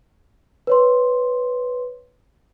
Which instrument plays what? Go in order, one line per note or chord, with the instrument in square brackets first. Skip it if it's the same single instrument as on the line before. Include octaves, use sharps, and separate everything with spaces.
[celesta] B4 C#5 C6